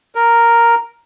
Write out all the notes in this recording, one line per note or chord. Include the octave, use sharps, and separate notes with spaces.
A#4